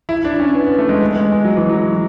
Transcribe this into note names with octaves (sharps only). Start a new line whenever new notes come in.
E4
D4
C#4
B3
B3
A3
G#3
B3
G#3
G#3
F#3
E3
F#3